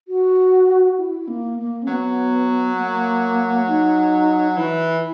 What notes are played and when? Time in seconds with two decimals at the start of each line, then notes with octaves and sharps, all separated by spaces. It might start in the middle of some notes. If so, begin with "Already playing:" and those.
0.08 F#4
0.98 E4
1.28 A#3
1.58 A#3
1.83 C#4
1.87 F#3 B3
2.77 A#3
3.67 D#4
4.57 E3 E4